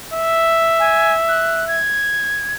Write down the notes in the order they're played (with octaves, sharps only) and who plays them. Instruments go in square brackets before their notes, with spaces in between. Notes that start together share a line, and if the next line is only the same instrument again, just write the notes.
[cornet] E5
[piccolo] G#5
F#6
G#6